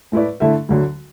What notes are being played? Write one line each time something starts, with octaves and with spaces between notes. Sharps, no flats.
A2 A3 E4 B4 D5
D3 A3 E4 A4 E5
D2 D3 F#3